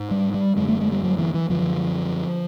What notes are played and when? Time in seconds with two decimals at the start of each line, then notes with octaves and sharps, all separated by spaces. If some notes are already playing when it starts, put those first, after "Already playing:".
Already playing: G#2
0.11 G3
0.34 G3
0.57 F#2 D3 G#3
0.68 A3
0.80 G#3
0.92 G3
1.04 F#3
1.19 E3
1.34 E3
1.50 F#2 D3 F3